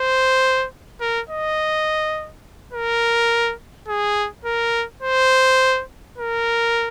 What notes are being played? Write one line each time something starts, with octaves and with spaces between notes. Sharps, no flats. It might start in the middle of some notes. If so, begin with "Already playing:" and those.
Already playing: C5
A#4
D#5
A#4
G#4
A#4
C5
A#4